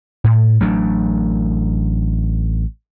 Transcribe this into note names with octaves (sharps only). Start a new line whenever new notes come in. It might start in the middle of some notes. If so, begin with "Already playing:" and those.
A2
A1 F#3 A3 D4